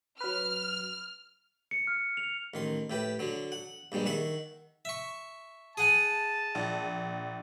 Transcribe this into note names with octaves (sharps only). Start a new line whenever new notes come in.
F#3 B4 F6
C#7
F6
F7
A1 D#3 C6
A2 G4 B4
D3 F#3
F#5
A#1 G2 G3 G#3
D#3 E5 F#5 C#6
E5 C#6
G#4 F#5 G#5 A5
A#1